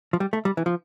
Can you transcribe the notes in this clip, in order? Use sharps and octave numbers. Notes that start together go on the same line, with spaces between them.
F3
G3
A3
G3
E3
F3